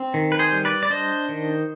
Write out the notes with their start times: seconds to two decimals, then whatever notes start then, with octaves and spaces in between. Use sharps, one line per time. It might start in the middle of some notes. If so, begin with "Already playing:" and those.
Already playing: C4
0.14 D#3
0.32 B4
0.39 G#4 C5
0.52 G3
0.65 B4 D5
0.83 D5
0.90 D4 C5 D#5
1.29 D#3